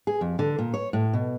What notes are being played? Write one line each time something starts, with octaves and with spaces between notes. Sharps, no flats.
G#4
F2
D3
A#2
C#5
A2
B2